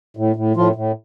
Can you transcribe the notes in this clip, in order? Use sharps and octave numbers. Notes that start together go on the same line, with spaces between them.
A2
A2
A2 F3 F4
A2